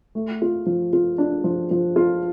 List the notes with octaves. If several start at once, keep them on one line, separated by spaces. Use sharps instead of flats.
A3
F4
F3
F4
D4
F3
F3
F4